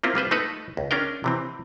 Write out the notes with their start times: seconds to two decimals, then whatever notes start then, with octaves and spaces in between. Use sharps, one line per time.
0.04 A#3 C4 E4 F4
0.15 G3 F4 B4 C5
0.31 A3 D#4 A4 B4
0.77 C#2
0.91 C#4 D4 A#4 G5
1.24 C3 E3 C4